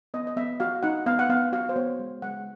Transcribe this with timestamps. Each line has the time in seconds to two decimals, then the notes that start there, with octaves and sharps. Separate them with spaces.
0.14 B3 D#5
0.27 D#5
0.36 B3 E5
0.60 F#4 F5
0.83 D#4 F#5
1.06 B3 F5
1.19 F#5
1.29 B3 F5
1.53 F#4 F5
1.69 C5
1.76 B3 C#5
1.99 G#3
2.22 G#3 F#5